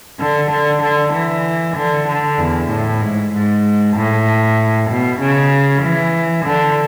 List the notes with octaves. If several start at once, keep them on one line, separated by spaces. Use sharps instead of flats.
D3
D3
D3
E3
D3
D3
E2
A2
G#2
G#2
A2
B2
C#3
E3
D3